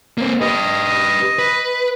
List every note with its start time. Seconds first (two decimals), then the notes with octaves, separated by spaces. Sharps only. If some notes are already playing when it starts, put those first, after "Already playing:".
0.18 A#3 C4
0.41 G4 B4 D#5
1.39 B4